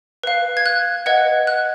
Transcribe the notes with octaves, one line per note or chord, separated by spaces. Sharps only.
B4 F5
G#6
F#6
B4 D#5 F#5 G#6
F#6